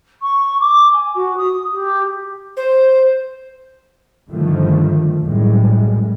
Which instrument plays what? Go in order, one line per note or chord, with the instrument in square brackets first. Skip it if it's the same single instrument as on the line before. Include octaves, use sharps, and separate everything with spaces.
[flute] C#6
D6
G#5
F#4
D#6
G4
[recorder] C5
[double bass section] G2 D3 D#3 F3 A3
A#1 F#2 A2 G3 G#3